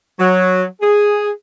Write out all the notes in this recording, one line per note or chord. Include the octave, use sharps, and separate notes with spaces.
F#3
G#4